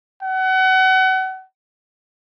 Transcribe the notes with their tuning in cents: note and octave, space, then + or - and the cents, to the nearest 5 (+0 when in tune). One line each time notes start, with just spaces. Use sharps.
F#5 +30